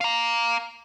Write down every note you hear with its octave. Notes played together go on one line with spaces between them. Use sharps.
F5 A#5